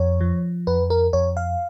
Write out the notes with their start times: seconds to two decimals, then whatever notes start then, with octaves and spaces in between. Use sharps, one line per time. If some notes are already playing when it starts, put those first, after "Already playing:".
Already playing: F2 C#5
0.21 F3
0.67 F2 B4
0.90 A#4
1.13 F2 C#5
1.37 F5